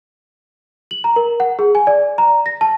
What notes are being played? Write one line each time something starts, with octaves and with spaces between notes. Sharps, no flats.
F#7
A#5
A#4
F#5
G#4
G#5
D5
A#5
A#6
A5